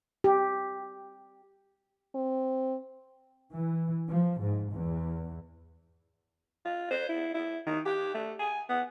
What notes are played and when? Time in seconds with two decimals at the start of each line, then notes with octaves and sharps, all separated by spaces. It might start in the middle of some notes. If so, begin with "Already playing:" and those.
0.24 G4
2.15 C4
3.51 E3
4.08 F3
4.39 G#2
4.72 E2
6.65 F4
6.91 C5
7.09 E4
7.34 E4
7.66 D#3
7.85 G4
8.14 A3
8.39 G#5
8.69 B3